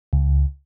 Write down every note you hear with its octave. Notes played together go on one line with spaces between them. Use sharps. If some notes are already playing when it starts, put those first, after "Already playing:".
C#2